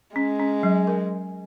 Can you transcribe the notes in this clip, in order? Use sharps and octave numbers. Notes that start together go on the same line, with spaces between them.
G#3 C#4
C#4
F#3
A#4